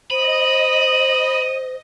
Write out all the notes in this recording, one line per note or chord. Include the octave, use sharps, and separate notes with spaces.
C5 D#5 B5 D#7